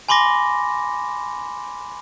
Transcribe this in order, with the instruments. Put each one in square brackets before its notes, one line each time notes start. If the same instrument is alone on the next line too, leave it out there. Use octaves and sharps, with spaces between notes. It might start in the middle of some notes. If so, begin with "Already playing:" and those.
[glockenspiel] G#5 B5 C6 D6 A#6